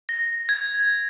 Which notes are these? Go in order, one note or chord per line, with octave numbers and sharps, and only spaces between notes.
A#6
G#6